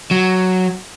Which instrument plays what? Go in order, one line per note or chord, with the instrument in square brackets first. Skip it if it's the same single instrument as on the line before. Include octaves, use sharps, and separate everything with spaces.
[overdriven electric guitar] F#3